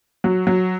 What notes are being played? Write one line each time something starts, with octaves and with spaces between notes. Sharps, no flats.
F#3
F#3